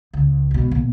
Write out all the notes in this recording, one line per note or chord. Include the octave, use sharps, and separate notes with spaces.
C#2
G#2 B2
A#1 B2